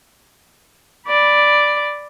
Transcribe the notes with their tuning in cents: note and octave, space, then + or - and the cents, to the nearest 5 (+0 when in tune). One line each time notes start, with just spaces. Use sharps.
D5 +0 B5 +0